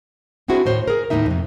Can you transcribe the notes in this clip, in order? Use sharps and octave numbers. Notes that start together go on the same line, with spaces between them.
C4 D4 E4 F#4 G#4 C5
D#2 A2 C5 C#5
G#4 A#4
D#2 A2 F#3 A#3 D#4 E5
F2 C3